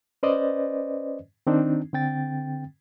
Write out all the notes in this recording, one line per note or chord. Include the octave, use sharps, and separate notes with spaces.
C#4 B4 C5 D5 D#5
D#3 C4 D4 D#4
D3 C4 G5 A6